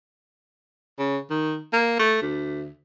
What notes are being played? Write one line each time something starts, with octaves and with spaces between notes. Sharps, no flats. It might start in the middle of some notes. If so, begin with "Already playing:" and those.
C#3
D#3
A#3
A3
D2